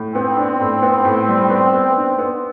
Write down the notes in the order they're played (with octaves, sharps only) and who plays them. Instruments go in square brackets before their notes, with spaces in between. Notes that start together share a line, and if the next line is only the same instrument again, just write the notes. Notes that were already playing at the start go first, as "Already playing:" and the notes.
Already playing: [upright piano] A2
[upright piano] B3 [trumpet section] C4
[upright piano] D4
A2
B3
A2
G3
B3
B3
D4
B3